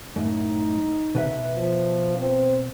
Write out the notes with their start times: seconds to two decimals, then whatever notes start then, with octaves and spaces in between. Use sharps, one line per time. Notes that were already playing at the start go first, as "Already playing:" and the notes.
0.16 F#2 A2 D#4
1.15 B2 B4 E5
1.54 F3
2.17 C4